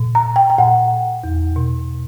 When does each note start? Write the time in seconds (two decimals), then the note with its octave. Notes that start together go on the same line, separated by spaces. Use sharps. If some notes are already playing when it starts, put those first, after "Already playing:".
Already playing: A#2
0.15 A#5
0.36 G5
0.50 G5
0.58 A#2 F#5
1.24 E2
1.56 B2